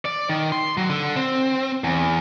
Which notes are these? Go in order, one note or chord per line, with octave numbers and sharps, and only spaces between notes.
D5
D#3
C6
F#3
D3
C4
E2